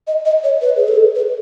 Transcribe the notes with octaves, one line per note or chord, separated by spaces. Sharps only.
D#5
D#5
C#5
B4
G#4
A4
B4